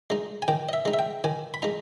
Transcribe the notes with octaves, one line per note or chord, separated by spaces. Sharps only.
G#3 D#4
G#5
D#3 G5
D#5
E5
G#3 D#4
E5
G5
D#3 G#5
B5
G#3 D#4 A#5